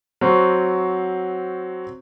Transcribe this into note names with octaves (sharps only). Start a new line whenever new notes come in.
F#3 C4 F#4 C5